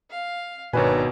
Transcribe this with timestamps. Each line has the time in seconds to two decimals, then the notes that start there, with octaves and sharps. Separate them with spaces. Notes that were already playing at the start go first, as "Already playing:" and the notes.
0.10 F5
0.73 G#1 B2 D#3 D4 B4 C#5 G#5 A#5